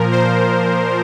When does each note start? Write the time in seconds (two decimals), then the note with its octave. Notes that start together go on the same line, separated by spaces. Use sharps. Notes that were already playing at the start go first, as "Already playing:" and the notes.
Already playing: A#2 F3 A#4
0.11 C5